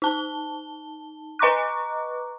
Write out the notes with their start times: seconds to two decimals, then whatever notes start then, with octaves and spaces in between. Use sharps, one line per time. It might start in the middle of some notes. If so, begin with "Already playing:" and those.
0.02 D#4 A5 G7
1.39 B4 D#5 A#5 C#6 D6 F#6